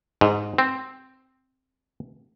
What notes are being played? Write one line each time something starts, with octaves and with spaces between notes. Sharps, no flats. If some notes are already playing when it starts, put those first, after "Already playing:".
G#2
C4